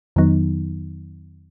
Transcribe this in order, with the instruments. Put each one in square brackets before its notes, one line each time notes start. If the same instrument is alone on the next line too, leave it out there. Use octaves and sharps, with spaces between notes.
[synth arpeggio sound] F2 D#3 F#3 B3 D#4